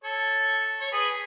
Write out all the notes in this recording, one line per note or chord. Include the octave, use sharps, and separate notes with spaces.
A4 C#5
C#5
G#4 B4